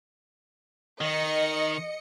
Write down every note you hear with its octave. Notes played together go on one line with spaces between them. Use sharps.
D#3 D#5 C#7